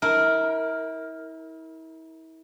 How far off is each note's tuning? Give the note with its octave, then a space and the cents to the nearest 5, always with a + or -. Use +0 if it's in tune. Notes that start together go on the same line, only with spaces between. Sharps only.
E4 -35 A#4 +0